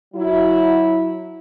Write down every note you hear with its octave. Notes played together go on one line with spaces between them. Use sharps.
F#3 E4